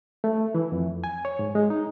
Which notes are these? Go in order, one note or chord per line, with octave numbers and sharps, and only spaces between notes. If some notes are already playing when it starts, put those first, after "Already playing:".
A3
E3
F2
G#5
C#5
G#2
G#3
D#4